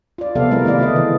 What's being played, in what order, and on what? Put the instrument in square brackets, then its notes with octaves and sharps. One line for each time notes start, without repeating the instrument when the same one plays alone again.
[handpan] F4 D5
C3 F3 B3 A4 D5 F5
G3 G#3 E4 A#4
D#3 A3 E4 D5 F5
C#3 F4 B4 D#5
D#3 E3